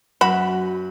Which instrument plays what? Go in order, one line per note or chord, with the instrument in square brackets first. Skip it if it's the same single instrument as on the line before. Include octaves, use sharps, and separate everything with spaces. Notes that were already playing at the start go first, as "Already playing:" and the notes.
[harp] F#2 [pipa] F#4 B5